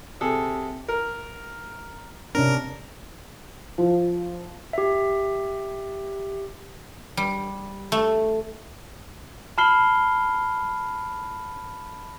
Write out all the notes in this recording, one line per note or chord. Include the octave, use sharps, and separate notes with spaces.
C3 G#4 A4
A#4
C3 C#4 D4 A#4
F3
G4 E5
G3
A3
A5 B5 F6 C7 G7